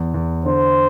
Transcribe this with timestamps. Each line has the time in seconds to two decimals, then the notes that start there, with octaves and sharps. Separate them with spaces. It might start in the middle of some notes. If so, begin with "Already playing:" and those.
Already playing: E2
0.14 E2
0.45 D3 C5